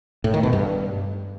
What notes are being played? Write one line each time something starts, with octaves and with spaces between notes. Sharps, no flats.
A2
D#3
B2
G2